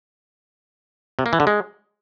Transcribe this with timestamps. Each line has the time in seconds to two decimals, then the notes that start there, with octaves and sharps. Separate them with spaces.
1.19 C3
1.26 A#3
1.33 E3
1.40 D3
1.47 G#3